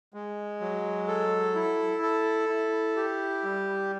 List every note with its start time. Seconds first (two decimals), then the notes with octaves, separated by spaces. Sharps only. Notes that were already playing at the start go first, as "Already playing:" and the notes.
0.14 G#3
0.61 F#3
1.08 A4
1.55 E4
2.02 A4
2.49 E4
2.96 G4
3.44 G3